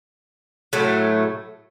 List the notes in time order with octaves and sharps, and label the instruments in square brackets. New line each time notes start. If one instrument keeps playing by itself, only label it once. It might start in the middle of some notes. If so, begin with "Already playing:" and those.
[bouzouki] A2 F#3 A3